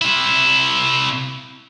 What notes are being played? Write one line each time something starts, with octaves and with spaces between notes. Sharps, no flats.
C3 E4